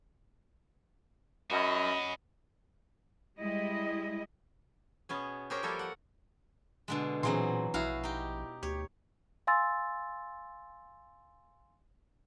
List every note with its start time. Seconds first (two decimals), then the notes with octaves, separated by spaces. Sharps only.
1.50 F#2 C#4 F#4 D#5 B5
3.37 G3 G#3 E4 D#5
5.09 B2 B3 C#4 G#4
5.50 G4 G#4 A#4 C5 C#5 G5
5.63 F3 G3 A#3 A4 A#4 C#5
5.79 F#5
6.88 B2 D3 G#3
7.23 A#2 E3 F#3 C4 G#4 D#5 C6
7.74 A#1 E4 F#4 G#4 F5
8.03 D#4 G4
8.63 D2 G4 C#5
9.47 F5 G#5 C6 E6 A6